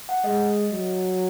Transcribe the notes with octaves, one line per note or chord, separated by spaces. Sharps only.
F#5
G#3 D#5
F#3